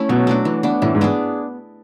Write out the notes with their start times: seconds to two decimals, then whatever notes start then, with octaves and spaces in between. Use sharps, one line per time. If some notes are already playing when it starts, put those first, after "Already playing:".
Already playing: A3 C#4 E4
0.09 B2 F#3
0.27 A3 D4 F#4
0.45 E3
0.63 B3 D4
0.82 A2 E3
0.95 G#2
1.01 B3 D4 G#4